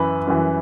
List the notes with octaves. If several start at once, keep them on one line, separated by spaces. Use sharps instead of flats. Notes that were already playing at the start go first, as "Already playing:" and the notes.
Already playing: F#2 E3 B4
F#2 E3